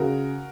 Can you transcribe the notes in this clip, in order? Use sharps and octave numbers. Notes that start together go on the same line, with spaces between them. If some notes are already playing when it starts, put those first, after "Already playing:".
Already playing: C#3 F#4 A#4